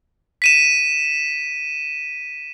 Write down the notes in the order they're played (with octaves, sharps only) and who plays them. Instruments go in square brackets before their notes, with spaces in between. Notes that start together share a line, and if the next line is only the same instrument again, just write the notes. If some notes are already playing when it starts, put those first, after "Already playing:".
[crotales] B6 D#7 E7